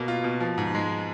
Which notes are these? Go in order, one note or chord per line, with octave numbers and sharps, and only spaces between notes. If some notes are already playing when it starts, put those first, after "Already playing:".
Already playing: B2 A#3
F4
B2
F3
G#2
G#3